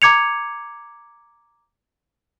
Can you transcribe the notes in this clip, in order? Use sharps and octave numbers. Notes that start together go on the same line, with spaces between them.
A#5 D6 G#6 C#7 F7